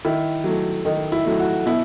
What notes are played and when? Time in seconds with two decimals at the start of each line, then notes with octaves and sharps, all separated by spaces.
0.05 D#3 E4
0.44 F#3 A3
0.85 D#3 D#4
1.12 E4
1.26 F#3 A3
1.40 F#4
1.66 B2 E4